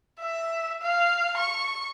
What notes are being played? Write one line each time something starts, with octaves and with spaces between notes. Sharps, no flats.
E5
F5
C#6